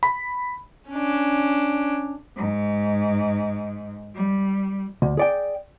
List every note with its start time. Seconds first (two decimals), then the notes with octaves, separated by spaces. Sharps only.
0.03 B5
0.89 C#4 D4
2.36 G#2
4.15 G3
5.02 D2
5.17 G#4 D5 G5